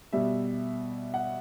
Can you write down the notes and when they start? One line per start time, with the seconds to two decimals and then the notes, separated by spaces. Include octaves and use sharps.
0.13 B2 G3 E5
1.14 F#5